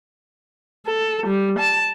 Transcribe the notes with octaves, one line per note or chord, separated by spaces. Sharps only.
A4
G3
A5